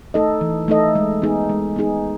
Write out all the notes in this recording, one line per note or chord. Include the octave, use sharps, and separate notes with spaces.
A3 D#4 A4 D#5
E3
A3 D#4 A4 D#5
G#3
B3 D#4 G#4
G#3
B3 D#4 G#4